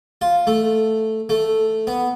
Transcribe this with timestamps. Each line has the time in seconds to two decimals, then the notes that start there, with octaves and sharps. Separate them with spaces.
0.21 F4
0.47 A3
1.29 A3
1.87 B3